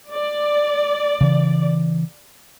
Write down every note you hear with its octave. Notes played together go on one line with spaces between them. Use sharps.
D5
C#3 E3